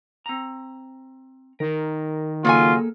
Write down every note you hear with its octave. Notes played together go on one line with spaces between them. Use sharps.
C4 A#5
D#3 A#4
C#3 F#3 A#3 F4 G#4 A4 G#5